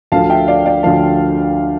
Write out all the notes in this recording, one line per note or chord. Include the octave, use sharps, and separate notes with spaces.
D2 D3 F3 F5 A5
E5 G5
D5 F5
D5 F5
D2 D3 F3 F5 A5